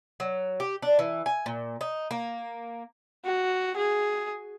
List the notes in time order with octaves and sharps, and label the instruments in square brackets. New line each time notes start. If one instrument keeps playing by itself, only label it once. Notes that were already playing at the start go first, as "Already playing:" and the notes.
[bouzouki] F#3
G4
D4
E3
G#5
A#2
D#4
A#3
[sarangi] F#4
G#4